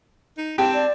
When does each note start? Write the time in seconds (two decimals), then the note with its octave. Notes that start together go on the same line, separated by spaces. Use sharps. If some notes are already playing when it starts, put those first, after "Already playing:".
0.38 D#4
0.58 C4 G4 A5
0.74 D5